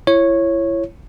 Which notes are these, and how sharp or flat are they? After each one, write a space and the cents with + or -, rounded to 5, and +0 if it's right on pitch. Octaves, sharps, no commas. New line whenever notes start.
E4 +30 C#5 -10